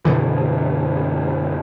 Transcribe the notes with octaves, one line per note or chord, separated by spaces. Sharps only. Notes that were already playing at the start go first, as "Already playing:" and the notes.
F#2 B2 D3 E3